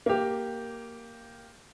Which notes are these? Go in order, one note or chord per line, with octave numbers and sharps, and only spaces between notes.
A#3 G4